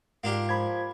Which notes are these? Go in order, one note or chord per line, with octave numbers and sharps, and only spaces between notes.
G#2 A#3 D4 F4 G4
F3 B5 G#6